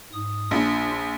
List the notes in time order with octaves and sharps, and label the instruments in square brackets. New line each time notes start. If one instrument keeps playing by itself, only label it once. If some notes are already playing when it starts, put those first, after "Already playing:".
[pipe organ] G#2 D#6
[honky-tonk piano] A#1 [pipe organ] D4 F4